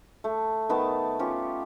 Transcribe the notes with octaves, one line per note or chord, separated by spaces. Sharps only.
A3
D#3 B3 A5
C#4 F4 G4